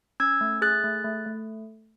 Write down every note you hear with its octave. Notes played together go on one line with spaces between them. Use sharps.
C#4 E6 G#6
A3
G#4 F#6 A6
A3
A3
A3